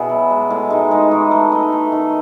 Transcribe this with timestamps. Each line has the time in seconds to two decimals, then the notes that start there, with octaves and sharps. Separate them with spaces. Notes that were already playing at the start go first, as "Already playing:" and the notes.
Already playing: B2 E4 F#4 G#4
0.09 F#3
0.30 G#3
0.50 A2
0.70 G#3 D#4
0.91 G#3 D#4
1.11 E3
1.31 A3
1.52 A3 D#4
1.72 A3
1.92 D#3